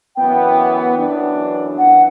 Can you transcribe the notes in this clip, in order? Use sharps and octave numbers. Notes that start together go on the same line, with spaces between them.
F#2 E3 B3 G5
F#2 E3 B3 D4
E3 F#5